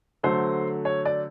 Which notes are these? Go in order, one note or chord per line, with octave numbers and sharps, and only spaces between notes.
D3 F#3 A3 C5
C#5
D5